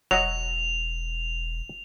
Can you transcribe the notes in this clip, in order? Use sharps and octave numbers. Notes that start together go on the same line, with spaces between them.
E1 F#3 F#4 D#5 F7